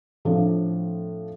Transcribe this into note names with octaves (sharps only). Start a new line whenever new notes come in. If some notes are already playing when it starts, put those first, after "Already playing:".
A2 F3 C4 D4